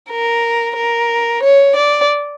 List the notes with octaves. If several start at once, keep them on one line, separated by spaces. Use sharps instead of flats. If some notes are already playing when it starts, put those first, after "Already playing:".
A#4
A#4
C#5
D5